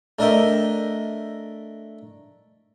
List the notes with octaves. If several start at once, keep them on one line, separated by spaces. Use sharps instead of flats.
A3 D4 A#4 D#5 E5 G5